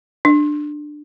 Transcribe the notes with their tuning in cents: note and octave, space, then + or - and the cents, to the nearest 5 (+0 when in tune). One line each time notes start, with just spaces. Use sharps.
D4 +15